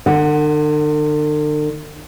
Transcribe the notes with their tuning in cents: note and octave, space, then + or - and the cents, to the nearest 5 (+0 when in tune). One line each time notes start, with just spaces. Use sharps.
D3 +45 F#5 +0